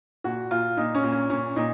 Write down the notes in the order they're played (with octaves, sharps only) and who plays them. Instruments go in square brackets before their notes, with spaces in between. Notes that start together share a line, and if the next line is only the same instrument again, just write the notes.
[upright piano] A#2 F#4
A#2 F4
A#2 D#4
C#4
A#2
C#4
A#2 C#4
A#2 D#4